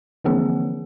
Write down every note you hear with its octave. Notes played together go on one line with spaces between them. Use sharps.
D3 E3 F3 A#3 C4 G#4